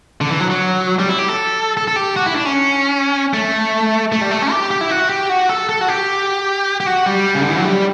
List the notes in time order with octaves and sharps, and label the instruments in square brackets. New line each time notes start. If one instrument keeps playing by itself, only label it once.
[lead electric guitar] D3
E3
F#3
F#3
G3
E4
G4
A4
A4
A4
G4
F#4
E4
D4
C#4
A3
A3
G3
A3
C#4
G4
G4
E4
F#4
G4
F#4
A4
A4
F#4
G4
G4
F#4
G3
C#3
D3
E3
F#3
G3